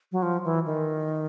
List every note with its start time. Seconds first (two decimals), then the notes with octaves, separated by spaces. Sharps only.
0.12 F#3
0.23 F3
0.44 E3
0.66 D#3